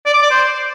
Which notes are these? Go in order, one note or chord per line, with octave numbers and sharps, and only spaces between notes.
D5
D6
D5
C5